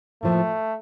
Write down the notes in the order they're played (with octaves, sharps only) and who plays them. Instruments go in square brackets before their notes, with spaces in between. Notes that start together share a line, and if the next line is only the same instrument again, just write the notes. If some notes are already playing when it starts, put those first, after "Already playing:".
[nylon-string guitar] A2 F3 A#3 [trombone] A3